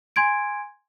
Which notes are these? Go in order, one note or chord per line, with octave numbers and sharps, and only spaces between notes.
G#5 C6 G#6 D7